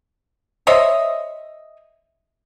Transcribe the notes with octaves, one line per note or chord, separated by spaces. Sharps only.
C5 C#5 D#5 E5